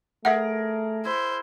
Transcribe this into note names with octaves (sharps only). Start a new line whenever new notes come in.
A3 G#4 A#4 E5 F#5
E4 C5